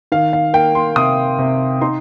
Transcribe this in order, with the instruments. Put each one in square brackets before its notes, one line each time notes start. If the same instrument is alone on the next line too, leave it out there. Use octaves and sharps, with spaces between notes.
[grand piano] D#3 F5
F5
A#3 G5
C6
C3 D#6
C3
D#4 C6